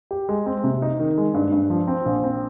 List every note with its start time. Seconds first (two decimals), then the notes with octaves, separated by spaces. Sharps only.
0.11 G4
0.29 G#3
0.46 C4
0.64 C3
0.82 D#4
0.99 D#3
1.17 G#3
1.34 G2
1.52 G2
1.70 F3
1.87 C4
2.06 A#1
2.24 C4